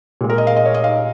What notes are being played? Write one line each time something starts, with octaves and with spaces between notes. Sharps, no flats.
A#2 G#3
A#4
D#5
F5
D#5
C#5
D#5
F5